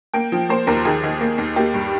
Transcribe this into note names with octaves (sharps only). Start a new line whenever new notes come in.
A#3 G5
F3
A#3 C5
D#2 A#4
D#3 G#4
D#3
A#3
D#2
A#3 G4
G2